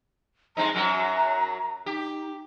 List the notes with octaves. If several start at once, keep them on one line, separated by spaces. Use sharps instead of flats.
G#3 C4 D#4 A#5
F#2 F#3
D#4 G4